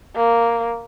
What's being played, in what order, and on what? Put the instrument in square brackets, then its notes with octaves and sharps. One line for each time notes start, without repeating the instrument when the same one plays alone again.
[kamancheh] A#3